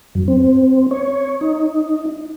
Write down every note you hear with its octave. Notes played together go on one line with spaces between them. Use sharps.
F#2
C4
C#5
D#4